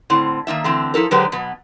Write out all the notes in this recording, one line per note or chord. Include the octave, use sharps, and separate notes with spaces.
A2 D3 C4
D#3 A#3 D4 E5
D3 E3 A3 C4
F3 E4 A4 A#4
D3 F#3 G#3 G4 B4 C5
B2 F#3 B3